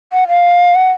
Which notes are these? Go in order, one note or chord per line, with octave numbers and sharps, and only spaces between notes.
F#5
F5
F#5